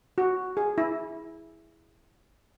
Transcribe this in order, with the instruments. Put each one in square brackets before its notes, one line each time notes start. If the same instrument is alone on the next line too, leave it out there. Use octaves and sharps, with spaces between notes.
[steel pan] F#4
G#4
E4